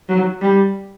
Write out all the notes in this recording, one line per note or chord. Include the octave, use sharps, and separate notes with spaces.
F#3
G3